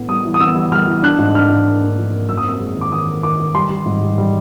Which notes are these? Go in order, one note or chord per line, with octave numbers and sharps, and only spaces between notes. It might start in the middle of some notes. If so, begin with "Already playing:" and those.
Already playing: A2 B3
G3 D#6
E3
D#6
B3 E6
G3
G3 F6
E3
D4 F#6
G#2
D4 F6
G#2
A#3
D4
F3
A#3
F#2 E6
D#6
C4 E6
G#3
D#3
D6
D#3 D#6
D#3
D#3 D6
D#3
G3 C6
G3
G#2
G3
G3